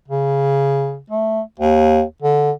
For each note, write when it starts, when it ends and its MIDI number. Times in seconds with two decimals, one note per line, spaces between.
0.08 0.99 49
1.10 1.41 57
1.59 2.02 39
2.22 2.51 50